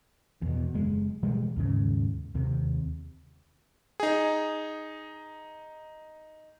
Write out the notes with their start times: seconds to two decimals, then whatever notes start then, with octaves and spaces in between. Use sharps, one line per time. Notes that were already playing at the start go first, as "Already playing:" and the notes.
0.42 E2 B2
0.74 F#1 G#3
1.23 B2 E3 G3 G#3
1.56 D#2 G#2 C#3
2.35 D#2 C3
4.00 D#4 G#4